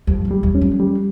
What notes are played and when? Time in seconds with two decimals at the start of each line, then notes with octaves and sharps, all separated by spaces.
0.07 F2 G3
0.25 F2
0.31 G3
0.43 E2
0.55 C#4
0.61 F2
0.79 G3